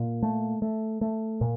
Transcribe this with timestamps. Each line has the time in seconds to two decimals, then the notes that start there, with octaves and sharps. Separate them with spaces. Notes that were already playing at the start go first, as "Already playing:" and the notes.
Already playing: A#2
0.23 A3
0.62 A3
1.01 A3
1.41 A#2